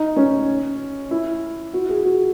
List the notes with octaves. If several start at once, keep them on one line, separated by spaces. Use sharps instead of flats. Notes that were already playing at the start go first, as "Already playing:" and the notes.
Already playing: D#4
C#4
E4
F#4
G#4
F#4